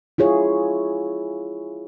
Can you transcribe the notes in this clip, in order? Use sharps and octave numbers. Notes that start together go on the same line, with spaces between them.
E4 F4 G#4 C#5